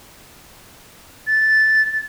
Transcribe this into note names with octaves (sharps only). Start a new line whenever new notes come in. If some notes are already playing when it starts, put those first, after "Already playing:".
A6